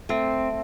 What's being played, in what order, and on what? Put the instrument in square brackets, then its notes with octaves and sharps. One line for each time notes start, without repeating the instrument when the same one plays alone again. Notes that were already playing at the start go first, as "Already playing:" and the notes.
[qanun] A3 [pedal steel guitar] C4